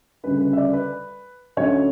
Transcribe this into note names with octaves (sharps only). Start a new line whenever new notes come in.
D2 C#3 G3 C#4 B4
B4
E5
D5
B4
D2 D3 F#3 C#4 C#5